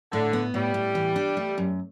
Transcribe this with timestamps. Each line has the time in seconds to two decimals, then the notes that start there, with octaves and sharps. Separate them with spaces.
0.12 A2 D3
0.33 B3
0.54 A2 G3
0.74 A2
0.95 E3
1.16 D4
1.37 A3
1.58 F#2